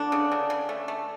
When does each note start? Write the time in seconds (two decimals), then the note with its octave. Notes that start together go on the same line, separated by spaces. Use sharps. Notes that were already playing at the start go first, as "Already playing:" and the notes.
Already playing: D3 D4
0.12 C#3
0.32 C#3
0.50 C#3
0.69 A3
0.88 A3